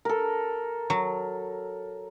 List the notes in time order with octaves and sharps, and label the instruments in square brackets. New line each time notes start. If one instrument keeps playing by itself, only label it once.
[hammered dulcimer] A4 A#4
[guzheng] F#3